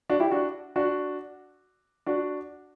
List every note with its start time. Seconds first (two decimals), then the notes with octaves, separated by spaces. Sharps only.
0.09 D4 F#4
0.20 E4 G4
0.31 D4 F#4
0.76 D4 F#4
2.06 D4 F#4